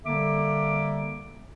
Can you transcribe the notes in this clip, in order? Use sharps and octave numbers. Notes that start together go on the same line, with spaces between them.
D3 G3 A#3 A4 E5 D6